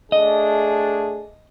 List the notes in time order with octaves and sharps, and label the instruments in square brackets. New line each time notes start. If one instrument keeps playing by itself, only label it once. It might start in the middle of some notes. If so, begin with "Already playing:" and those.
[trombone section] A3 D4 G#4 [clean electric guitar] D#5